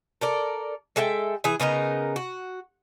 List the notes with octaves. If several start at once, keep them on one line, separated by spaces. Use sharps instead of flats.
A4 A#4 D5
G#3 A4 E5 G5
E3 G#4
C#3 B3 D#4 A#4
F#4